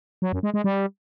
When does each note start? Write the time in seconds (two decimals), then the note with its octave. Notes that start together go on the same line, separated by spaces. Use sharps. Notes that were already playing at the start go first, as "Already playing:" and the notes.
0.22 F#3
0.33 F#2
0.43 G#3
0.54 G#3
0.64 G3